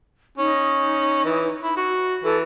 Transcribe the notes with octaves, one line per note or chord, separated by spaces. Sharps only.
C#4 D#4
E3
E4
F#4
E3 A4